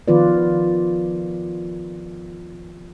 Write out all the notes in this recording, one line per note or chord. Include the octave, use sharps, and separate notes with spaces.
D#3 F3 B3 F4 B4 D5